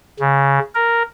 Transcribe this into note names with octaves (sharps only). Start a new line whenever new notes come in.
C#3
A#4